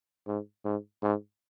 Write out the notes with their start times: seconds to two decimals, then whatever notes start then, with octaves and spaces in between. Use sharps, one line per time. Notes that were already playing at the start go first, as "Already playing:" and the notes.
0.27 G#2
0.65 G#2
1.03 G#2